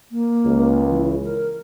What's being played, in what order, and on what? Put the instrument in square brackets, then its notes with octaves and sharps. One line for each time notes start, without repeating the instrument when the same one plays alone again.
[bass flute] A#3
[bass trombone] C#2
[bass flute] E3
A#4